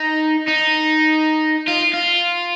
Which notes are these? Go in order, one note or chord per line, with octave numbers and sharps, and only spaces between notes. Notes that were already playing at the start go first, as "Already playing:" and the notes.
Already playing: D#4
D#4
F4
F4